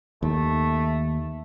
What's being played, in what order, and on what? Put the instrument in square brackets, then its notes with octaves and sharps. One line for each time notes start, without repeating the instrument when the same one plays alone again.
[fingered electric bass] D#2 [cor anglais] A3